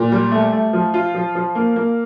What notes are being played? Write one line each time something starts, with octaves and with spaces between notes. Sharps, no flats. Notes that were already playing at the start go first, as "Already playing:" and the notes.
Already playing: A#2
G3
A3
A3
F3
F4
F3
F3
A#3
A#3